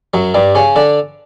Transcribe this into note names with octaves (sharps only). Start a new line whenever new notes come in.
F#2 F#3
G2 G3
C#3 C#4
D3 D4